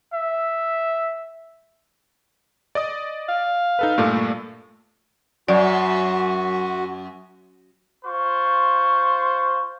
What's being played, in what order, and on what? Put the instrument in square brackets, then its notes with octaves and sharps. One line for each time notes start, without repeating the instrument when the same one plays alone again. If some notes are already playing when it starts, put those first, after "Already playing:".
[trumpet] E5
[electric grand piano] D5 D#5 D#6
[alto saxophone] F5
[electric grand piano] D#4 A4 B4
G2 A#2 A3
[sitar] F#2 [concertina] F#4 [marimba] D5
[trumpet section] F4 C5 C#6